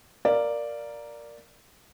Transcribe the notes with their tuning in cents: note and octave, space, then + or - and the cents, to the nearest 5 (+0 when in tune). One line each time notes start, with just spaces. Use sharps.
A#4 +0 D5 +0 F5 -10